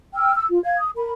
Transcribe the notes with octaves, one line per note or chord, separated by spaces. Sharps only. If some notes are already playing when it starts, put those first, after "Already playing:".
G5 E6 F6
E6
F4
F5 G#6
D#6
A#4 B5